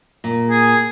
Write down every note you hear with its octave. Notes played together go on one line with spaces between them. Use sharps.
A#2
G#4